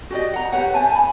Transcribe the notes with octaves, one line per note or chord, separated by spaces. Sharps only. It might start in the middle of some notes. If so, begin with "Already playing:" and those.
F#4 G4 D5 D#5
F#5 A#5
G4 B4 C#5 F#5
C5 E5 G#5 A5
G#5 B5